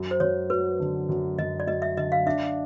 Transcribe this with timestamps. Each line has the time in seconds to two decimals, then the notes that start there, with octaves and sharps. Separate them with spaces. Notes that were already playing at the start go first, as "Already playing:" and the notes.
Already playing: F#2
0.11 C5
0.20 F#2 C#5
0.50 F#3 B4
0.80 D3
1.09 F#2
1.38 F#2 D#5
1.60 D5
1.67 F#3 D#5
1.82 E5
1.97 D3 D#5
2.12 F5
2.26 D4 E5